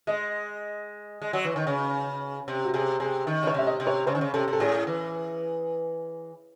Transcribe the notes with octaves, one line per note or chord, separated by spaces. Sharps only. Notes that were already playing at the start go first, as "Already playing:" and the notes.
G#3 D#5
G#3
F#3
E3
D#3
C#3
C3
F#4
C3 G#4
C3 G#4
D#3
C#3 C#5
C3 E5
D#5
C3
C#5
C#3 C5
D#3
C#3
C3 A4
C3
A4
A2 G#4
E3